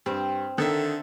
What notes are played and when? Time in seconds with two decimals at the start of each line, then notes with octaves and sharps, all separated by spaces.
0.06 G2 C4
0.58 D3 D#3 A4 E5